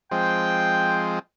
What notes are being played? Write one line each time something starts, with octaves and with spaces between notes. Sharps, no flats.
F3 G#3 C4 G5